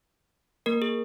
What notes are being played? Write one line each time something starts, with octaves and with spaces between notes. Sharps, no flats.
A#3 A#4
G#4